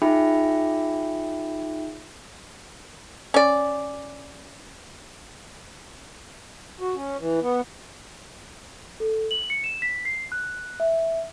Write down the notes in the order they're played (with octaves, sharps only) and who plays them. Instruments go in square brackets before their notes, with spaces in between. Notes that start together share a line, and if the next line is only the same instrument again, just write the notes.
[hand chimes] D#4 F4 G#4 E5 G5 B5
[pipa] C#4 D5
[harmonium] F#4
C#4
E3
B3
[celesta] A4
F#7
C#7
E7
B6
C7
F#6
E5